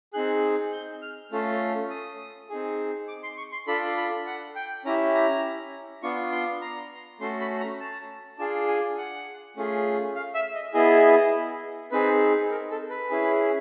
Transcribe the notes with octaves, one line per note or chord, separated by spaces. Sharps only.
C4 D#4 G#4 F#6
G6
F6
A3 C#4 F4 A4
D#6
C4 D#4 G#4
D6
C6
C#6
C6
D4 F4 A4 B5
B5
F#5
G5
C#4 E4 G4 A#5
A#5
B3 D4 F4 C#6
C6
A#5
A3 C#4 F#4 A4 C6
B5
A#5
A5
D4 F4 G#4 A5
G#5
F#5
A3 C#4 F4 G#4
F5
E5
D#5
B3 E4 G#4 D#5
C4 D#4 G#4 B4
A#4
A4
B4
C#4 E4 G#4